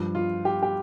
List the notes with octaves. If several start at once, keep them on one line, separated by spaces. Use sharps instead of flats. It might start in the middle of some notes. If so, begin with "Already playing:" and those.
Already playing: G2 F3
F4
G4
G4